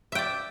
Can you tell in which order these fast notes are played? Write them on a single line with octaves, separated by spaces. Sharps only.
E5 G5 D5